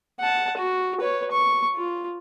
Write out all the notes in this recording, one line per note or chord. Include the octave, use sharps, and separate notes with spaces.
F#5 A5
F#4
B4 C#5
C#6
F4